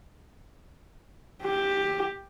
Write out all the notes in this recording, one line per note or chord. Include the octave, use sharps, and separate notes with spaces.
G4